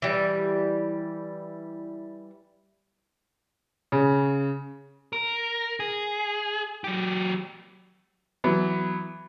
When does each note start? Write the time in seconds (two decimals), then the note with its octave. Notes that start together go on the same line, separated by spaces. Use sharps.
0.02 E3 G3
3.92 C#3
5.13 A#4
5.80 G#4
6.84 F#3 G4
8.44 E3 F#3 B3